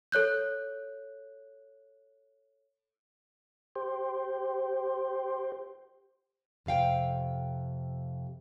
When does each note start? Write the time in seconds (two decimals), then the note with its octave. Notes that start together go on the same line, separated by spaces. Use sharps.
0.12 A4 C#5 F#6 G6
3.76 G4 C5
6.66 F2 C3 F5 G5